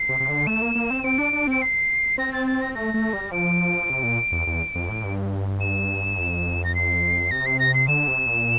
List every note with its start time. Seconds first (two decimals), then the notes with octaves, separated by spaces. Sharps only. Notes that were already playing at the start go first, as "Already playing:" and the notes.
Already playing: C7
0.09 C3
0.20 C3
0.29 D3
0.47 A3 E7
0.62 A#3
0.75 A#3
0.91 C4
1.04 C4 D7
1.18 D4
1.33 D4
1.47 C4 D7
1.62 C7
2.18 C4 A#6
2.33 A6
2.47 A6
2.62 A#6
2.75 A3 A#6
2.94 A3
3.13 G3
3.32 F3 D7
3.90 C3
4.03 A#2
4.32 E2
4.47 E2
4.75 F2
4.89 A2
5.04 G2
5.61 E7
6.18 F2
6.64 A#6
6.75 C7
7.31 C3 A#6
7.46 C7
7.59 A#6
7.74 C7
7.88 D3 E7
8.08 C3
8.26 A#2